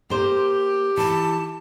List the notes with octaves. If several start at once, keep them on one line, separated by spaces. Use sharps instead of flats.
A#3 G4 C5
E3 A5